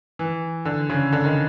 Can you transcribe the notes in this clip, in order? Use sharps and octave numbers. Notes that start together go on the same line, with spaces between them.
E3
D3
C#3
D3
D#3